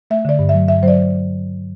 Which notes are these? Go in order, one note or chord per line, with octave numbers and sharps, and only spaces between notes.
A3 E5
D3 D5
G2
F#3 E5
G2 E5
F#3 C5 D5